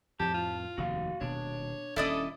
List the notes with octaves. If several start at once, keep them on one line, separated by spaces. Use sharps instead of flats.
F2 A2 F3 G4 A5
F4
F1 D#2 C3 F#4 F5
D#1 B2 D4 C#5
D#1 C#4 E4 A4 D5 D#5